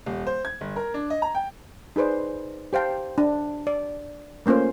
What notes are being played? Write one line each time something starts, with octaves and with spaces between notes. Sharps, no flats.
D#1
C5
G#6
G1
A#4
D4
D#5
A#5
G5
D#4 G#4 B4 C5 D5
G4 C5 F5 G5 A5
D4
D5
A3 A#3 C#4 F4 C5